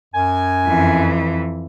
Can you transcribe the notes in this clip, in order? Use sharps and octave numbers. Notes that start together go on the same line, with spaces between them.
F#2 G#5
F2 E3